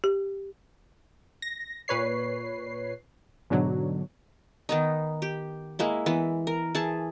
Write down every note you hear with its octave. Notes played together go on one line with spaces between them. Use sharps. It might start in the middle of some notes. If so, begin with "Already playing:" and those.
G4
A#6
A#2 B4 C#5 C7
G#2 B2 D3 F#3
D#3 B3 D#4
G4
G#3 A#3 E4
E3 B3
A#4
E3 G#4 A5